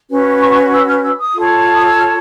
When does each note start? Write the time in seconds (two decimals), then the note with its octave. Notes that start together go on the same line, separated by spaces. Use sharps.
0.09 C#4 F#4 B4
0.41 C#6
0.51 C#6
0.72 E6
0.88 F6
1.03 E6
1.19 D#6
1.35 F4 A4 C#5
1.74 D#6
1.86 E6
1.98 F6